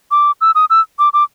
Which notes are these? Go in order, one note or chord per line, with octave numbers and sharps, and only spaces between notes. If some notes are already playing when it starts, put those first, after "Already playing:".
D6
E6
D#6
E6
D6
D6